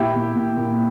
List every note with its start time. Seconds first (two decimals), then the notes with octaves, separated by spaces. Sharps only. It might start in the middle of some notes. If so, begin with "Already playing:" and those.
Already playing: A#2 E4 G4
0.15 A#2
0.36 A#2
0.57 A#2